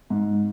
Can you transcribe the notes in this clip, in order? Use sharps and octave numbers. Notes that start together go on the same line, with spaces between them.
G#2